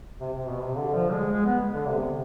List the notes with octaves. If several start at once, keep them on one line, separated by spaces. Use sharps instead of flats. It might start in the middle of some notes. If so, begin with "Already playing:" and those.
C3
C3
B2
C3
D3
F3
G#3
G#3
B3
D3
C3